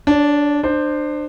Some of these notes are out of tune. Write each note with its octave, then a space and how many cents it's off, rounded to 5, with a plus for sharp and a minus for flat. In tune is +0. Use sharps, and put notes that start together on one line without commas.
D4 -10 C#5 +20
D4 +30 C5 +0